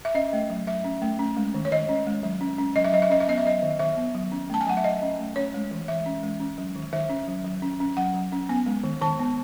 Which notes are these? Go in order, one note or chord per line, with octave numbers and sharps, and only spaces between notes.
E5
C#4 D#5
A3
F#3
F#3 E5
C#4
A3
C#4
G#3
D#3
C#5
D#3 D#5
C#4
G#3
F#3
C#4
C#4
F#3 D#5
E5
F#3 D#5
E5
C#4 D#5
E5
B3 D#5
E5
F#3 D#5
D#3
D#3 E5
B3
F#3
C#4
A3 A5
G#5
F#3 F#5
E5
F#3 D#5
C#4
A3
C#4 C#5
G#3
E3
E3 E5
C#4
G#3
C#4
F#3
D#3
D#3 E5
C#4
F#3
F#3
C#4
C#4
F#3 F#5
F#3
C#4
B3 G#5
G#3
D#3
D#3 A5
B3